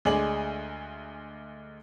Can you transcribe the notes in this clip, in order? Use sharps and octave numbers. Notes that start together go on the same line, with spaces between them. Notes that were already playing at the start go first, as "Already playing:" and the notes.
D2 G#3 G#4 D5 F#7